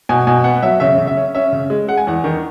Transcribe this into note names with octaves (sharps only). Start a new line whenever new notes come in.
B2 G#5
B2 G#5
B3 F#5
F#3 E5
C#3 E5
C#3
E5
C#4
C#4 E5
C#3
G#3
G#3 F#5
G#5
E2 F#5
D#3